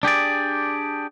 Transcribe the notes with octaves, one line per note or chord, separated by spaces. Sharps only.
D4 G4 G#4 D5